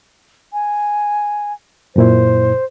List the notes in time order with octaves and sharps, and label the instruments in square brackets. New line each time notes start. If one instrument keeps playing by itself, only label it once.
[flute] G#5
[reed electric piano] F#2 A#2 E4 [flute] C5